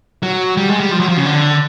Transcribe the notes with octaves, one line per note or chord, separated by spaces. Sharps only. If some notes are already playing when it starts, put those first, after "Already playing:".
F#3
G3
G#3
G3
F3
F#3
F3
C#3
D3